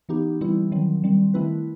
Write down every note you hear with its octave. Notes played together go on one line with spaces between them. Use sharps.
E3 B3 D#4 G4
E3 G3 C4 E4
D#3 F#3 C4
D#3 G3 C4
D#3 A3 C4 E4 B4